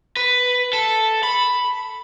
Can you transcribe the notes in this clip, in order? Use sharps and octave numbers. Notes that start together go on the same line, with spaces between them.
B4
A4
B5